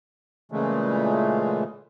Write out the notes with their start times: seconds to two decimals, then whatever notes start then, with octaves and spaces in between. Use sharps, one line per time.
0.52 A#2 C#3 E3 G#3 A3